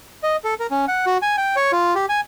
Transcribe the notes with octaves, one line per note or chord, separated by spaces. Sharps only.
D#5
A4
A#4
C#4
F#5
F#4
G#5
G5
C#5
F4
G4
G#5